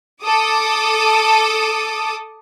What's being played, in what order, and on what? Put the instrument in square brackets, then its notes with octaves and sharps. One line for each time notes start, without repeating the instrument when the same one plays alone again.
[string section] A4 D6 D#6